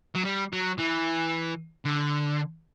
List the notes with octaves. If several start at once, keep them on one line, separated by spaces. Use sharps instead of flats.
F#3
G3
F#3
E3
D3